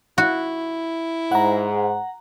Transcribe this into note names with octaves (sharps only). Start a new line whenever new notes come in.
E4 F#4
G#2 F#5 A#5